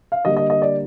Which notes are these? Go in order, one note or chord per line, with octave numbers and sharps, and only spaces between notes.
F5
D3 G3 A#3 D#5
D#5
D#5
D5